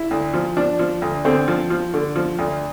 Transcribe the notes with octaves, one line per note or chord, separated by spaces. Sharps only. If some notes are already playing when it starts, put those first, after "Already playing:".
Already playing: E4
D2
F3
F3 D4
F3
D2
D3 C4
F3
F3
D3
F3
D2